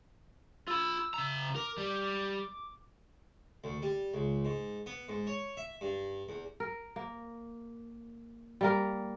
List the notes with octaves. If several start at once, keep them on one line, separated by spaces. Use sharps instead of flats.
F4 B5 E6
C#3 A#5
A#4 D6
G3
D2
G3
C#2
G#2
B3
G#2
C#5
E5
G2
E2
A#4
A#3
G3 A#3 A#4